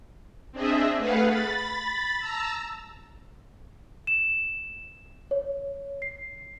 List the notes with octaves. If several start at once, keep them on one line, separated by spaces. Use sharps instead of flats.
C4 D4 G#4 D#5 E5
A3 G#4 B4 F5 F#5
B5 A6
A5 A#5 E6
E7
C#5
C7